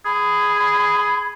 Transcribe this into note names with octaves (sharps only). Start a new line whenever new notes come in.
G#4 B5